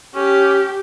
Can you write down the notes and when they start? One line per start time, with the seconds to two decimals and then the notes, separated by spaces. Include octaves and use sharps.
0.15 C#4 G4